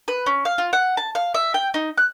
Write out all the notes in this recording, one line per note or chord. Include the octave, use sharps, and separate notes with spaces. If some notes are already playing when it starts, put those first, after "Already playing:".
B4
C#4
F5
F4
F#5
A5
F5
E5
G5
D#4
F#6